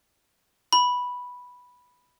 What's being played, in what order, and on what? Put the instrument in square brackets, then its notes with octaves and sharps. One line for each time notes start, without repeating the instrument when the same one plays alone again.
[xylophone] B5